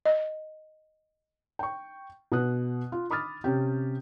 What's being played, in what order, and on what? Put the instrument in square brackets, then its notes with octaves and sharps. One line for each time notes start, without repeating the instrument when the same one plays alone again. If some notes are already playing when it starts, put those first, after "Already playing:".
[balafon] D#5
[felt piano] G5 C#6
B2 B3 D#6 F#6
F4
B5 D6 D#6 F6 A6
C3 C#4 G4